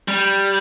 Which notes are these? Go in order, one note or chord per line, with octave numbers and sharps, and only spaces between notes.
G3